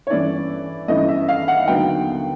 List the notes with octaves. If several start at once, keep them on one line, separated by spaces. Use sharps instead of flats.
C#5
G2 E3 A3 C#4 E4 D5
G2 E3 A3 C#4 E4 D#5
E5
F5
F#5
D#2 D3 F#3 B3 G5